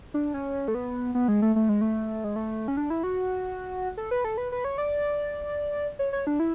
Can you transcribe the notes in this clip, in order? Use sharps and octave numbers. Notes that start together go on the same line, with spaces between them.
D4
C#4
A3
B3
B3
G#3
A3
A3
G#3
A3
G#3
A3
C#4
D4
E4
F#4
A4
B4
A4
B4
B4
C#5
D5
C#5
C#5
D4
E4